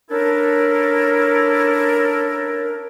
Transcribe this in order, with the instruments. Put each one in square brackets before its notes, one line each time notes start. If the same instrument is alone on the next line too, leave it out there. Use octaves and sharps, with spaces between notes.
[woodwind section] C#4 D4 E4 A4 A#4